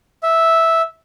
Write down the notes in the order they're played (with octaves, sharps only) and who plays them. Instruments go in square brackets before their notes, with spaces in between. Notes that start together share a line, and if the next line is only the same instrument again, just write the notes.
[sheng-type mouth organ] E5